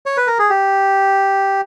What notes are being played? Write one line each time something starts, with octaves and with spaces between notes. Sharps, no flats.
C#5
B4
A#4
G#4
G4